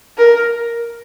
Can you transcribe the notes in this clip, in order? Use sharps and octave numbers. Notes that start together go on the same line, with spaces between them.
A#4